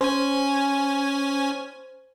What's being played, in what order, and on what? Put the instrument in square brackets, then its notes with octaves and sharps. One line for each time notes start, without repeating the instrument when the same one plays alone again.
[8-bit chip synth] C#4 G#5 [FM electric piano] C5